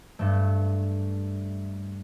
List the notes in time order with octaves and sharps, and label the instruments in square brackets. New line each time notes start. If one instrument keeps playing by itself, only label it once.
[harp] G2 A3